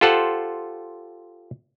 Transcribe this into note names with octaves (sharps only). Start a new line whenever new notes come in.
F4 G4 A4 C5 F#5